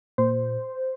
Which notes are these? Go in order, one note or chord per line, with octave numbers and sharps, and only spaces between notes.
A#2 C5